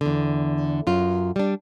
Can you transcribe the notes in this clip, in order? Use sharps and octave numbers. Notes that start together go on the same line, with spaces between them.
E2 D3
F#2 F4
G3 D4